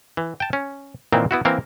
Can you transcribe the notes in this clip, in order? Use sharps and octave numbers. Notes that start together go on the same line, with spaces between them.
E3
G5 A5
C#4
A#2 D#3 E3 A#3 C4
B3 E4 F#4
E3 A#3 C4 A#4